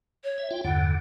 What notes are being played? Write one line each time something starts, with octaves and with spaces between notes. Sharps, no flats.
C#5
E5
F4 G5
E2 G2 D3 F#5